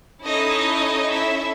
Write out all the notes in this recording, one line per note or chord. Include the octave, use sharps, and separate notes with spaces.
C#4 D#4 E4 A4 D#5
E4 E5